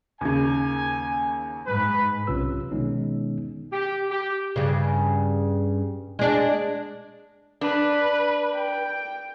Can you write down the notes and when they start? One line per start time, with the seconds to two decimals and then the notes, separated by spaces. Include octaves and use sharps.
0.21 D#2 C#3 G#5
1.67 G#2 B4
2.27 B1 C3 C#4 F4 B4 E6
2.71 B2 D#3 G#3 B3 C#4 D#4
3.73 G4
4.11 G4
4.56 G2 C#3
6.19 G#3 D4
7.61 D4 B4
8.54 G5